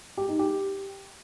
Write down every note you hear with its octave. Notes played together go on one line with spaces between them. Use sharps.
G4
D#4
G4